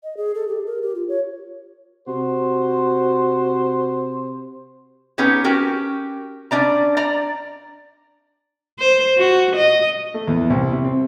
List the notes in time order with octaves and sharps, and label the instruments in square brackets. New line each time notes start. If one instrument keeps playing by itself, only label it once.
[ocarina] D#5
G#4
A4
G4
A#4
G4
F4
C#5
[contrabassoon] C3 [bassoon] F#4 [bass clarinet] C5
[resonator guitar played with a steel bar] B3 C#4 D#4 G4 C#5
C#4 F#4 G4 A#4
C#4 D4 D5 A#5
D5 A#5
[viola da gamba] C5
F#4
D#5
[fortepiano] A3
E2
C2
C3
C4